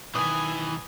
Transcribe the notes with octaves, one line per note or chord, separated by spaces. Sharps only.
B1 D#3 E3 G#5 D#6